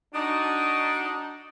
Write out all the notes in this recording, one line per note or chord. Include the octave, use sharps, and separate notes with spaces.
D4 D#4 F#4